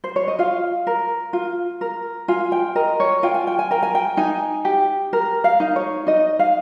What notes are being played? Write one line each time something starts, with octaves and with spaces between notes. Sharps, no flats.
C5
C#5
D#5
F4 F5
A#4
F4
A#4
F4 G#5
G5
A#4 D#5
C#5
F4 G5
G#5
G5
G#5
A#4 G5
G#5
G5
D#4 G#5
G4
A#4
F5
D#4
C#5
D#4 D#5
F5